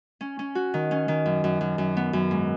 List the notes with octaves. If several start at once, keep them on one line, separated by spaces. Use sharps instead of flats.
C#4
C#4
F#4
D#3
C#4
D#3
F#2
F#2
F#2
F#2
B3
F#2
G#2